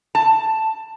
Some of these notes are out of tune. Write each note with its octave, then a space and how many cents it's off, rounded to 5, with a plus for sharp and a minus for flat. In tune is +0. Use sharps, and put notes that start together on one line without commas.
A5 +5